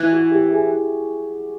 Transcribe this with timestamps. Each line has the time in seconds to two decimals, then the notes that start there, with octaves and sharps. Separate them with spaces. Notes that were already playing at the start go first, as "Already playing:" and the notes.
Already playing: E3
0.12 F#4
0.31 G4
0.51 G#4